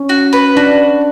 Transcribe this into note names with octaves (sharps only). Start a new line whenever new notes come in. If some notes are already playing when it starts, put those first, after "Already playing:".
Already playing: C#4
F#4
B4
D4 F#4